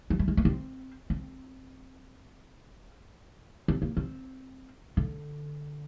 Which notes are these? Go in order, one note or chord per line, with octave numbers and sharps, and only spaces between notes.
F3
G3
G#3
A#3
C4
C4
C4
A#3
C4
D3